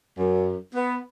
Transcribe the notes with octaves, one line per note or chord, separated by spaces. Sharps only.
F#2
B3